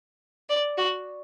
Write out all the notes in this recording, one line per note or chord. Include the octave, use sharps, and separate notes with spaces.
D5
F#4